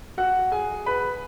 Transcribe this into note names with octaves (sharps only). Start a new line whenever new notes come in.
F#4 F#5
G#4 G#5
B4 B5